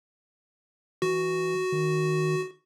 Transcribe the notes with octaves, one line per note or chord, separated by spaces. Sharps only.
E3 F#4
D#3